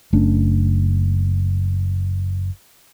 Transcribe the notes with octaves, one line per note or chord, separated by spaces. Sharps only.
F#1 A3 C#4 D4